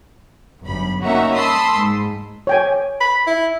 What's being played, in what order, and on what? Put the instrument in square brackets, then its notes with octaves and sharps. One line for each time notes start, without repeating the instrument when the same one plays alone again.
[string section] G1 F#2 B5
A#3 C#4 D#4 F#4 E5 A#5
A5 B5 C6 D#6 E6
G#2
[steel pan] C#5 G5 G#5
[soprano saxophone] B5
E4